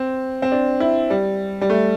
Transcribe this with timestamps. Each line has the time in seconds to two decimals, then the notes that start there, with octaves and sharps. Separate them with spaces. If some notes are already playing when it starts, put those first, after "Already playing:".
Already playing: C4
0.42 C4
0.52 D4
0.80 E4
1.10 G3
1.61 G3
1.70 A3